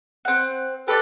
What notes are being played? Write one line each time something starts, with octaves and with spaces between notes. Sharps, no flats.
C4 F#5
G4 A4 B4 D5